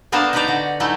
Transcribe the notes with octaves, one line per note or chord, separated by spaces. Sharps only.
A#3 B3 D4 A#4 C5 A5
D#4 F#4 B4 C5 D5 A#5
D3 F#4
F#3 G#3 A3 D#4 E4 F#4